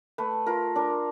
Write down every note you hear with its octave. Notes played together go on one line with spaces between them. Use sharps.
A3 B4
F4 A#4
D4 A#4